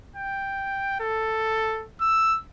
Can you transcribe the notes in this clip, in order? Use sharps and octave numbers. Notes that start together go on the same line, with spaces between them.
G5
A4
E6